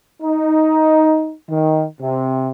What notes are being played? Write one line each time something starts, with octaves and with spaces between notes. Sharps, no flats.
D#4
D#3
C3